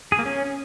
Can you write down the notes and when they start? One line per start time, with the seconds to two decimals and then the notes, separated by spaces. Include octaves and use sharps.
0.12 G#4
0.19 A#3
0.25 C#4